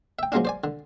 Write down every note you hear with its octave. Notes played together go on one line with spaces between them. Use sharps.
E5 G5
F3 F#3 G#3 A#3 C#4 D4
C5 D5 G#5
D3